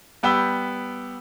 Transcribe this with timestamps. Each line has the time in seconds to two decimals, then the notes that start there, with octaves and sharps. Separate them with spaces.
0.23 G3 B3 G5 B5 E6 G7